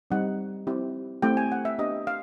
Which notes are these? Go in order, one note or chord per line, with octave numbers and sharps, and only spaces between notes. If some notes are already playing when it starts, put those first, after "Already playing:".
G3 C4 D#4 F#5
C4 E4 G4
A3 C4 E4 G4 G5
G#5
F#5
E5
B3 D4 G4 D#5
F5